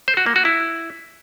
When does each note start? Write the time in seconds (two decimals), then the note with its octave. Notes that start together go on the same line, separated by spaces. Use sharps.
0.08 C5
0.17 F#4
0.26 A#3
0.36 F#4
0.45 E4